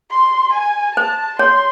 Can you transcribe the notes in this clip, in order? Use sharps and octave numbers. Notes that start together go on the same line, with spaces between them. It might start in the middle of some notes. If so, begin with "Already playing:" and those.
C6
G#5
C5 A5
C#5 C6